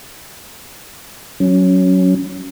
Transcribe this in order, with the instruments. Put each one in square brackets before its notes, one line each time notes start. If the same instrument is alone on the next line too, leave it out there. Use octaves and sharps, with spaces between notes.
[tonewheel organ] F#3 C#4